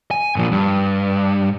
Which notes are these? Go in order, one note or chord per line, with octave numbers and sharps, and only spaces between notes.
G#5
A#2 F3
G2